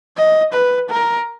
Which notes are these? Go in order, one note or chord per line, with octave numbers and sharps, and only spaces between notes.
D#5
B4
A#4